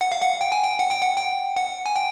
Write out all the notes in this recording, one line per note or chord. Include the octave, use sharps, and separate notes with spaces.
F#5
F5
F#5
G5
G#5
G5
F#5
G5
F#5
G5
F#5
G#5
G5